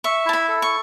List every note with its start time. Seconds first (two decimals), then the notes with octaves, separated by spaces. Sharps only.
0.04 E5 C#6
0.26 E4 A5
0.33 B5
0.48 A4
0.62 C#6